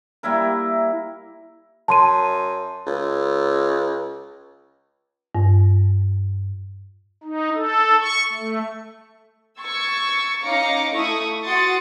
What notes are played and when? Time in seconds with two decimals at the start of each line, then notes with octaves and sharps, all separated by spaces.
0.23 G3 A#3 E4 A#4
1.88 F#2 A5 C6 D#7
2.87 C#2
5.35 G2
7.24 D#4
7.55 A4
8.00 C#6
8.33 A3
9.60 C#6 E6 G#6 A6
10.42 C#4 D#4 F5 D6 A#6 C#7
10.92 A3 E4 C#6 D#6
11.43 F#4 C6 D6 D#6 A6 C#7